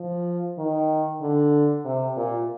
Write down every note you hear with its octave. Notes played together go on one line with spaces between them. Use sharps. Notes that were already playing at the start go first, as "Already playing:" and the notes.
Already playing: F3
D#3
D3
C3
A#2